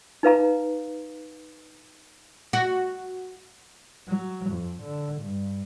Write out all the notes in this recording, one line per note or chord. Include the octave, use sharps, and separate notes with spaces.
D#4 B4 F5 A#5
F#4
F#3
F2
D3
G2